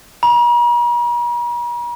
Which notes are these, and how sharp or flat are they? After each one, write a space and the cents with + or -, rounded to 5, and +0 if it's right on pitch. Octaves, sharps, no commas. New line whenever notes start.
A#5 +45